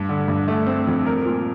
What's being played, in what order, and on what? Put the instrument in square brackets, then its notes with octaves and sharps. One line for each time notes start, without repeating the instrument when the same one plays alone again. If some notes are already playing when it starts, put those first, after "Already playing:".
Already playing: [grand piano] G2
D3
G2
A3
C4
F2
A#4
A#2